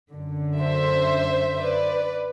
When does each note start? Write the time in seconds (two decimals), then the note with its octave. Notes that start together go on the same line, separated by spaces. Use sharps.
0.13 F#2 D3
0.61 C5 E5
1.59 B4 D5